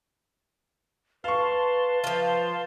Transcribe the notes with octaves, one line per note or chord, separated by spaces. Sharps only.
B4 F5 A5 C6 C#6
F3 F4 B4